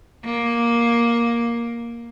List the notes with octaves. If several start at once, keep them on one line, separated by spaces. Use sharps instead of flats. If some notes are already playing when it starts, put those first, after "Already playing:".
A#3